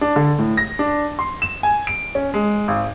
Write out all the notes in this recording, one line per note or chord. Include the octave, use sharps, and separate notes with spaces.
D4
D3
A2
A#6
D4
C6
E7
G#5
D7
C#4
G#3
G#1